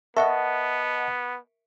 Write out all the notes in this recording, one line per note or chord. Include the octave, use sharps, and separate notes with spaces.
B3 A#4 D#5 E5 F#5 A5 C#6